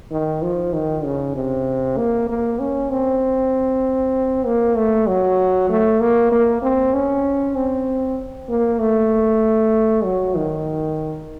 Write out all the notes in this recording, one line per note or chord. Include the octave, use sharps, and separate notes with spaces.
D#3
F3
D#3
C#3
C3
A#3
A#3
C#4
C4
A#3
A3
F#3
A3
A#3
A#3
C4
C#4
C4
A#3
A3
F#3
D#3